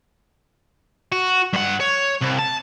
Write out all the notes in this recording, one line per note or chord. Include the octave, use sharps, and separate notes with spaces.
F#4
G2 F#5
C#5
C2
A5